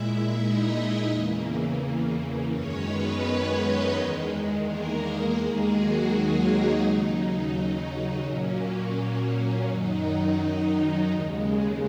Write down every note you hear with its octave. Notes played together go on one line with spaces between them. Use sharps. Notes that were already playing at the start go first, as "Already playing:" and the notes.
Already playing: A#2 G#3 E4 E5
D#4 D#5
E2 C#3 E3 A#3
F#2 D#3 G#3 C#4 C#5
B3 B4
C#4 C#5
D#4 D#5
E2 D#3 G#3
A#3 A#4
D#2 D#3 G#3 A#3 G#4
F#3 F#4
D#4
D#2 C#3 F#3 D#4
A#2 F#3 A#3 C#4
F#2 D#3 F#3 D#4
D#2 C#3 G#3